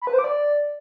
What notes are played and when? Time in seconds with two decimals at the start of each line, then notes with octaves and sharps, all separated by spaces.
0.02 B5
0.07 B4
0.13 C5
0.19 D6
0.24 D5